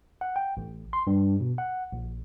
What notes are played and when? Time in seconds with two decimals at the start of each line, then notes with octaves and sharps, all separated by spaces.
0.21 F#5
0.36 G5
0.57 A1
0.93 C6
1.07 G2
1.40 B2
1.58 F#5
1.93 A#1